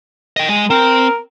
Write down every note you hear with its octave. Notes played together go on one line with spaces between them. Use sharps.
D#5 G5
G#3 G#5
C4 A#4